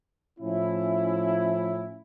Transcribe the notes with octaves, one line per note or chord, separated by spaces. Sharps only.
A2 F3 C#4 E4